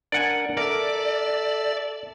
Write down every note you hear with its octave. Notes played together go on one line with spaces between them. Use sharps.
D4 A#4 D5 F#5 G#5
A4 A#4 D5 E5